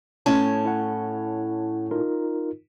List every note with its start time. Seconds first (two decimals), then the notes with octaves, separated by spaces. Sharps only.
0.26 A2 C#4 A5
0.65 E4 C#5 F#5
1.91 D#4 F4 A#4